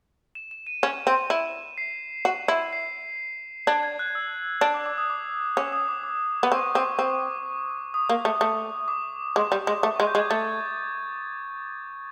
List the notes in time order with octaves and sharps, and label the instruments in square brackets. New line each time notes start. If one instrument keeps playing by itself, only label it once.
[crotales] E7
E7
D#7
[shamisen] C#4 [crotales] E7
[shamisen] C4
[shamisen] E4 [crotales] E7
[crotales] C7
[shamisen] F#4
E4
[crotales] C7
[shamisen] D4 [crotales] G#6
[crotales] G#6
F#6
E6
[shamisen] D4
[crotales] D6
D6
D#6
D6
[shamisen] C#4 [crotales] D6
[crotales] D#6
D6
D6
[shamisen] B3
[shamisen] C4 [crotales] C#6
[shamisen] C4 [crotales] D6
[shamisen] C4
[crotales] D#6
[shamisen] A#3
A3
A3
[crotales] D6
[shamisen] G#3 [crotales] D6
[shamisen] G3
G#3
[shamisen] A3 [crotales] D6
[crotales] C#6
[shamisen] G#3
[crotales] G6
[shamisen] G#3
[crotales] G#6
[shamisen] A3 [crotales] A6